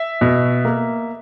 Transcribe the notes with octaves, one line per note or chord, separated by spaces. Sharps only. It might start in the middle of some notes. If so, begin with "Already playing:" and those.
Already playing: E5
B2
A#3